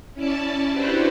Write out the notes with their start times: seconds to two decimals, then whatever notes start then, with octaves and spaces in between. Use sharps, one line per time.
0.14 C#4 E4 D5 A5
0.71 D4 E4 F#4 G4 B4 C5